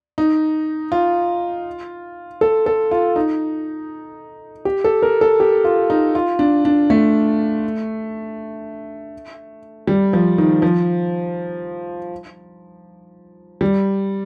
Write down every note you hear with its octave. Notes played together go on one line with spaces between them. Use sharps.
D#4
F4
A4
A4
F4
D#4
G4
A4
A#4
A4
G4
F4
D#4
F4
D4
D4
A3
G3
F3
D#3
F3
G3